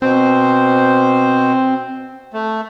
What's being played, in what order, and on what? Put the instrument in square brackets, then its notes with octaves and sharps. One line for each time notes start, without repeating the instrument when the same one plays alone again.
[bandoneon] B2 C5 [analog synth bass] C4
[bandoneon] A3